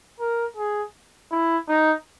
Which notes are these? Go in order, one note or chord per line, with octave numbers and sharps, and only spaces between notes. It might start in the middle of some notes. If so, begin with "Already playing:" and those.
A#4
G#4
E4
D#4